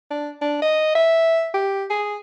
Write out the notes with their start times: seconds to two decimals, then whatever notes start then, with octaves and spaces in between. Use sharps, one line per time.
0.11 D4
0.42 D4
0.62 D#5
0.95 E5
1.54 G4
1.90 G#4